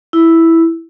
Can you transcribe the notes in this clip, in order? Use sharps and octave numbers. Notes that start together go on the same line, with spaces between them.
E4